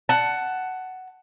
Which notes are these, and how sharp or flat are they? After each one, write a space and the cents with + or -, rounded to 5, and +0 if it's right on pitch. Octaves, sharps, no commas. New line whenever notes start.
F#5 +10 A5 +0